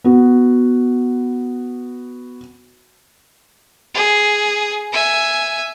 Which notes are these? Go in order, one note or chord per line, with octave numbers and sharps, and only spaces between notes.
B3 F#4
G#4
E5 G#5